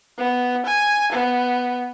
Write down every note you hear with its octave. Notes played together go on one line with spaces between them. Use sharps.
B3
G#5
B3